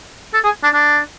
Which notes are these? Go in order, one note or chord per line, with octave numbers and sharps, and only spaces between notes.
A4
G#4
D4
D4